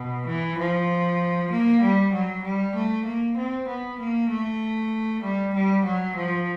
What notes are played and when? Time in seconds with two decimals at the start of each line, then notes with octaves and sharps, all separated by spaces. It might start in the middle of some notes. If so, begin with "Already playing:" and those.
Already playing: B2
0.27 E3
0.58 F3
1.51 A#3
1.82 G3
2.13 F#3
2.43 G3
2.75 A3
3.06 A#3
3.37 C4
3.68 B3
3.99 A#3
4.30 A3
5.22 G3
5.54 G3
5.85 F#3
6.16 F3